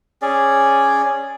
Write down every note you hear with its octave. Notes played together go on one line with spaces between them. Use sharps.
C#4 G#4 D5